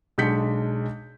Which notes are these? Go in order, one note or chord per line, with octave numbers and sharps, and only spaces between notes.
B1 G#3 D4 G6 B6 C#7